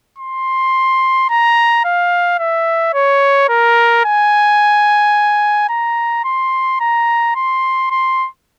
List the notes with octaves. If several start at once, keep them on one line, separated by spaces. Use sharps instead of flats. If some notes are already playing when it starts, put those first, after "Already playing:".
C6
A#5
F5
E5
C#5
A#4
G#5
A#5
C6
A#5
C6
C6